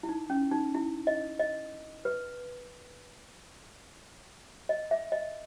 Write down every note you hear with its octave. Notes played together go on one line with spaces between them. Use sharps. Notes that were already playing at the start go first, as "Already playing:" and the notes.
E4
D#4
C#4
D#4
E4
D#5
D#5
B4
D#5
E5
D#5